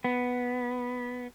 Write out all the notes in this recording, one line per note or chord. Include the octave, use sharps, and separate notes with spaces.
B3